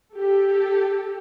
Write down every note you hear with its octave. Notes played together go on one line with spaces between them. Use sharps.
G4 A4